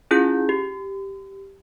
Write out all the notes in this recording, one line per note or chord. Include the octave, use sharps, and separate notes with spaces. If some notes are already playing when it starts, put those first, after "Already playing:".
C#4 E4 F4 G#4 G6
G4